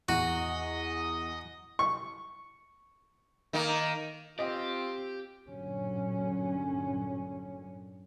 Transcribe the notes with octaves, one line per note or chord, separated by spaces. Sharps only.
E2 F#4 D#5
C#6
D#3 A#3
C4 F4 G4 D#5
G2 A#2 D3 F#3 C#4